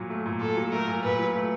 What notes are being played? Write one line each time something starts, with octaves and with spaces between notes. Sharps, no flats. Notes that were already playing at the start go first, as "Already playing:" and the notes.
Already playing: A#2 F#3
A3
A#2
A#2 A4
F#3
A3 A#4
A#2
A#2 B4
F#3
A3